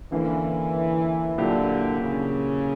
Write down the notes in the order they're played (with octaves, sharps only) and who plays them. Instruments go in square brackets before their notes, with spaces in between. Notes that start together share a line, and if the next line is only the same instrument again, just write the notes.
[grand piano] D3 A#3 C#4 [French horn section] E3
[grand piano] A#2 F#3 A#3 E4 G4 [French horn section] D3
[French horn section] C#3